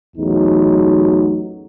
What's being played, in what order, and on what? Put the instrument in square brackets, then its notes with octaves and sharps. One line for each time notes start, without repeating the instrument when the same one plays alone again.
[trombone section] A1 E2 F#3 D#4